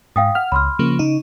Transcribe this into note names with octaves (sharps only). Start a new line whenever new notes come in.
G#2 F5 G5 D#6
F#5 F6
C#2 B5 C6 F6
C#3 F3 A#3
C#3 D#4